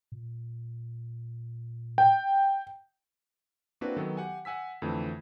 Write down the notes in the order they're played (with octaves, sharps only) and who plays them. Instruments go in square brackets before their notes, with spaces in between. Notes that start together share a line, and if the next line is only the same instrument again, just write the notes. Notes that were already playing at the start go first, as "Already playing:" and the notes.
[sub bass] A#2
[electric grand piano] G5
A#3 C4 D4 E4 F#4 B4
D#3 F#3 B3 A4
G4 F#5 G#5
F#5 G#5 E6 B6
F2 D3 E3 A3